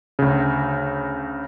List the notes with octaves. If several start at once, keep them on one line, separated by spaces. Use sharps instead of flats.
D2 C#3